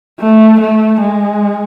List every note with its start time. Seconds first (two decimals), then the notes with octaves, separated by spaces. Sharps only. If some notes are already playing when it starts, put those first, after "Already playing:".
0.20 A3
0.61 A3
1.02 G#3